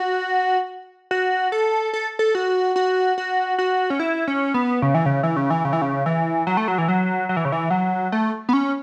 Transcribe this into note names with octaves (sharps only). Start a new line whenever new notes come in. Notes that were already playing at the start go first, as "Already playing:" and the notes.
Already playing: F#4
F#4
A4
A4
A4
F#4
F#4
F#4
F#4
C#4
E4
C#4
B3
C#3
E3
C#3
E3
C#3
E3
C#3
E3
C#3
E3
F#3
A3
F#3
E3
F#3
F#3
E3
C#3
E3
F#3
A3
B3
C#4